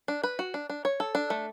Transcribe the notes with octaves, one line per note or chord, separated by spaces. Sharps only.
D4
B4
F#4
D4
D4
C#5
A4
D4
A3